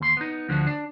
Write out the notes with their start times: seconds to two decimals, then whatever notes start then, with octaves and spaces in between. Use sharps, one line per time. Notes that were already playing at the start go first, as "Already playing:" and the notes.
0.01 D#2 C6
0.17 B3 D#4
0.49 D2 D3 F3 F#4
0.67 D4